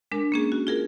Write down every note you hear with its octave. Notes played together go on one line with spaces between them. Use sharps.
G#3 D4 A#4
A#3 C#4 G#4
F#4
F4 G#4 A#4